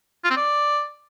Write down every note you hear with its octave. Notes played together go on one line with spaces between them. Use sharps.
F4
C4
D5